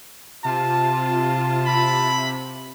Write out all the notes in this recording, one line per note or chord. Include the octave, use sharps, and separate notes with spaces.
C3 F4 A5
E4 B5